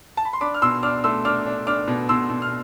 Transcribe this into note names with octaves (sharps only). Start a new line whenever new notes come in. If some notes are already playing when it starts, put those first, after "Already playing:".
A5
B5
C6
D4 B5 D6
F6
B2 C6 E6
D4 D6 F6
A3 C6 E6
D4 D6 F6
D4
D4 D6 F6
B2
B2 C6 E6
B2
F6